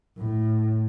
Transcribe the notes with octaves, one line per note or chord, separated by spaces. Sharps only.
A2